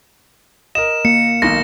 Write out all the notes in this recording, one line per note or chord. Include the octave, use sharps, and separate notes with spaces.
A#4 D#5 E7
A#3 C#7
B1 D#3 A#6